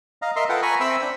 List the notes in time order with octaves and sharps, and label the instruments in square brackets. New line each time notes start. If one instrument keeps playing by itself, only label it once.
[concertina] D#5 F5 A#5
A#4 D#5 E5 A#5 C6
F4 A4 B4 F#5 G5
G#5 A#5 B5 C#6
C4 C5 E5 G5 B5 E6
D4 G5